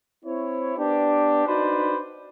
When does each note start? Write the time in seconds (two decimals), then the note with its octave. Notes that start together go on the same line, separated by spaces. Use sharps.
0.25 C4 E4 C#5
0.76 B3 D4 G4
1.46 D4 D#4 F#4 B4 C5 D5